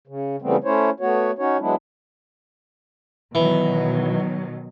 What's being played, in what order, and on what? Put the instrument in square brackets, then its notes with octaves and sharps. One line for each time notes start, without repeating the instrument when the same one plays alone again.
[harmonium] C#3
C#3 E3 G3 A3 B3 C4
A3 C#4 E4 C5 C#5
A3 B3 F#4 C#5
C#4 D#4 F#4 C#5
F#3 G#3 B3 D4 E4
[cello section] B2 D#3 F#3 [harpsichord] E3